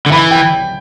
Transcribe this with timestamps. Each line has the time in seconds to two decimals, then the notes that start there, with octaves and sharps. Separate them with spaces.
0.06 D3
0.12 E3 B5
0.31 G5